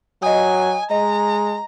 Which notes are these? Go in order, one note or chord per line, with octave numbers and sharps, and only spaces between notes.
F#3 D#5 G#5 D#6
G#3 D#5 A#5